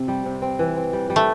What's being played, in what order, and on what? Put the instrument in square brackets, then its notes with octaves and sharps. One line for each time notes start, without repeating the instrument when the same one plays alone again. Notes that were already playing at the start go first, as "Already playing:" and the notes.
Already playing: [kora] C3 C4
G3
C3
C4
E3
C4
G3
G3
[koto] A3